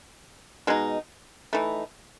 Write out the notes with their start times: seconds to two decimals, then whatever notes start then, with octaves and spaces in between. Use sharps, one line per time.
0.67 B2 G#3 D#4
1.53 E3 A3 D#4